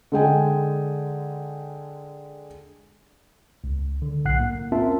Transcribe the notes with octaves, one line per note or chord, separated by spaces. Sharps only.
D3 G#3 G5 G#5
C#2
D3
B1 A2 F#5 F#6 C7
A#3
C4 C#4 F4 A#4 E5 A5